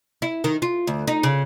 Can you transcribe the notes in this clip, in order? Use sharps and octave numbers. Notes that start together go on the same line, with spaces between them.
E4
D#3
F4
D2
D#4
C#3